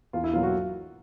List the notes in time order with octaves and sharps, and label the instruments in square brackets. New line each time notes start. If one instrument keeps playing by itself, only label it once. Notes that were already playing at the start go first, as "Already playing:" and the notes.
[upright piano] E2 F4
E4
B2 F#3 A#3 F4
F#4